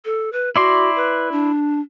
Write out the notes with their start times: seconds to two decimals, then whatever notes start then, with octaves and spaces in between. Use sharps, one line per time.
0.05 A4
0.32 B4
0.56 E4 F#4 D5 C6
0.96 B4
1.32 D4